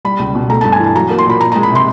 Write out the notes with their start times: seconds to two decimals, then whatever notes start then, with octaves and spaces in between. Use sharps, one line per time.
0.05 G3 B5
0.19 C#2
0.35 B2
0.50 A3 A#5
0.61 G2 A5
0.72 G#5
0.80 E3 A5
0.96 F#3 A#5
1.10 A#3
1.18 C6
1.26 A#2 B5
1.41 F3 A#5
1.52 G#3 A#5
1.63 B5
1.71 C3 C6